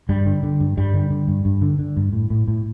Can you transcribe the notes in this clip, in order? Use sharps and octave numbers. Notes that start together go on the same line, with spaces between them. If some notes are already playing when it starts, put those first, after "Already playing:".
G2 G3
D3
D3
G2
G2 G3
D3
D3
G2
G2
D3
D3
G2
A2
A2
A2